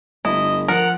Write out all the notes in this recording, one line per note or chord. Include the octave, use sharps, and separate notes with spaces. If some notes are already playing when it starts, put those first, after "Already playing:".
G1 A3 E4 D#5
F3 A#4 F#5